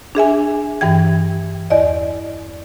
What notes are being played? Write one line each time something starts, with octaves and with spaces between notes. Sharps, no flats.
D4 G#4 E5 G#5
G2 E3 G5 G#6
E2 D5 D#5